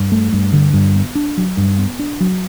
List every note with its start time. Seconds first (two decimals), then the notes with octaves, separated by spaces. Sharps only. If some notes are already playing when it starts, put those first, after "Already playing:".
Already playing: G2
0.12 A3
0.33 G2
0.53 D3
0.73 G2
0.96 B3
1.15 D4
1.37 F#3
1.57 G2
1.78 B3
1.99 D4
2.20 F#3